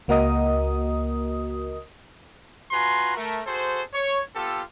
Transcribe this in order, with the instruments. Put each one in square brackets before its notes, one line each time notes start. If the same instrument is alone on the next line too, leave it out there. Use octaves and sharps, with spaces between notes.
[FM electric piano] C#2 A#3 F#4 A#4 D#5 D#6
[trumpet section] F4 F#4 B4 G#5 A#5 C6
A3 A#4
F#4 G#4 A4 C5
C#5
B3 F4 G4 A4